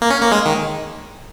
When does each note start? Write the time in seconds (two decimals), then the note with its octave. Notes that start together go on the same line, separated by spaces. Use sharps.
0.02 A#3
0.10 C#4
0.22 A#3
0.32 G#3
0.46 D#3